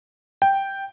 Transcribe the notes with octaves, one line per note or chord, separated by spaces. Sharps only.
G5